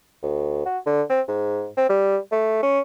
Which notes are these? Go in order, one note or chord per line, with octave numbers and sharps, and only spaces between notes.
D2
F#4
D3
C4
G#2
C4
G3
A3
C#4